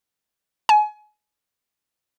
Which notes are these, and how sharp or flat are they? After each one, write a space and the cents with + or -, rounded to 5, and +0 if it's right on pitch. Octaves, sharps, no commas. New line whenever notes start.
G#5 +30